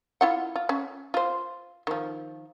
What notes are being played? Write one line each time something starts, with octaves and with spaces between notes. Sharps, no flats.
E4 F4 F#5
F4
C#4
F4 C5
D#3 F3